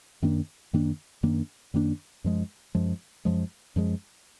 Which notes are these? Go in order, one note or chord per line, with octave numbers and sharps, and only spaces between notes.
F#2 D#3 A#3 D4
F#2 D#3 A#3 D4
F#2 D#3 A#3 D4
F#2 D#3 A#3 D4
F#2 F3 G#3
F#2 F3 G#3
F#2 F3 G#3
F#2 F3 G#3